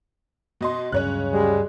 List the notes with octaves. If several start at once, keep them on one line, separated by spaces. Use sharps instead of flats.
B2 D#5 C6
D2 G2 C#3 F#3 C#4 C#5 F#6
G3 G#3